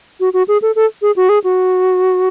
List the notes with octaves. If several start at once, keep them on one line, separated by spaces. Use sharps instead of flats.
F#4
F#4
G#4
A4
A4
G#4
F#4
G#4
F#4